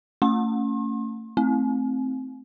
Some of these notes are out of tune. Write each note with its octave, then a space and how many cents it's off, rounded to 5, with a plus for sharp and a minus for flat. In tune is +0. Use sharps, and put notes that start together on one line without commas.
A3 +35 C#4 +0 C6 +45
A3 +0 C4 +0